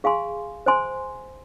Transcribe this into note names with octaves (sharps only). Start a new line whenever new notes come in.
G#4 F5 G#5 C6
C5 G#5 C6